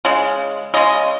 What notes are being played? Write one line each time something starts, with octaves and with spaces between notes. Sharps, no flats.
C#3 G#3
C#3 G#3 D#5